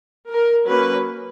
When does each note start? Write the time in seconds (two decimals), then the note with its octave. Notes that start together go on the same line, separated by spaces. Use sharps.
0.29 A#4
0.66 F#3 A#3 C#4 B4